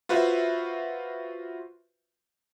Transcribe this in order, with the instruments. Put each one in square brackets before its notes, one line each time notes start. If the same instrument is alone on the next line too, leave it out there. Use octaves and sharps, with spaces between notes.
[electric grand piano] F4 F#4 B4 C5 E5